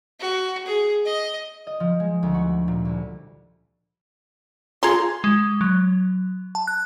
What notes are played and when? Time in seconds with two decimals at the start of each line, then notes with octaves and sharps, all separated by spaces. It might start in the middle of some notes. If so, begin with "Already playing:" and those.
0.20 F#4
0.66 G#4
1.05 D#5
1.67 D#5
1.80 F3
2.00 G#3
2.23 D2
2.34 F#4
2.68 A#2
2.85 C2
4.83 F4 G#4 A#5 C6
5.24 G#3
5.61 F#3
6.55 A5
6.67 F#6